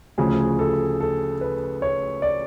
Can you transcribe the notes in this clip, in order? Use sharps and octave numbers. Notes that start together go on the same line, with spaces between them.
D2 C#3 F3 G#4
A4
A4
B4
C#5
D5